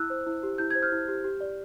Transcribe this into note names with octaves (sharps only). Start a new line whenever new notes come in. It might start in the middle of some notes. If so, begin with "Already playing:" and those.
Already playing: E4 E6 F#6
C5
E4
G4
E4 G6
C5 G#6
F6 G6
E4
G4
G4
D5